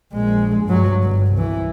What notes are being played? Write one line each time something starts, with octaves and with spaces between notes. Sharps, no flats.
A#1 G#3
G2 F#3
G1
C2 E3